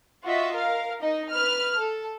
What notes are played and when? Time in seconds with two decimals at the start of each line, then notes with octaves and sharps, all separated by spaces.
0.23 F4 F#4 D#5 E5
0.55 A#4 F5
1.01 D#4 D#5
1.30 B4 F6
1.77 A4